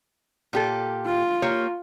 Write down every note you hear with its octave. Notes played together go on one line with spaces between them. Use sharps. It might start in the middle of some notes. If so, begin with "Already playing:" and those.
A#2 G4 A4
F4
A#3 G4 C#5